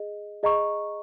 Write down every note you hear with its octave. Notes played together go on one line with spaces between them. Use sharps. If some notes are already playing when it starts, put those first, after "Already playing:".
Already playing: G#4 D#5
G#4 D#5 A#5 C#6